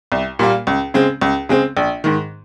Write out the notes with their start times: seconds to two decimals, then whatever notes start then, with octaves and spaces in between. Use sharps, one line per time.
0.12 C2
0.39 A#2 G3 A#3
0.67 C#2
0.94 C#3 G#3 C4
1.21 C#2
1.49 C#3 G#3 C4
1.77 A#1
2.04 G#2 D#3